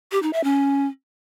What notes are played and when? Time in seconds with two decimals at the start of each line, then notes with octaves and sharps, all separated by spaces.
0.12 G4
0.22 D#4
0.33 E5
0.44 C#4